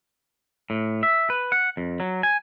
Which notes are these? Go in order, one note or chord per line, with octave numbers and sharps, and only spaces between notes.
A2
E5
B4
F#5
F2
F#3
G#5